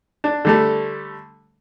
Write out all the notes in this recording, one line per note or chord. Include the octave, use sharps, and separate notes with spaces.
D4
D3 G3 A3